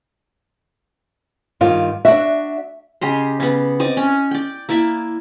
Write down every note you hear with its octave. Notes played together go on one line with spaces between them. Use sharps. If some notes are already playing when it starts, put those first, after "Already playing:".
G2 D#3 F4
D4 F#4 E5
C#3 G4 D#5 C6
C#3 B3
C4 D5 D#5
C#4
D5 G5
A#3 E4 D5 E5